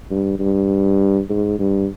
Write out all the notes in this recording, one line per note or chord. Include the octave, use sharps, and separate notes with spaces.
G2
G2
G#2
G2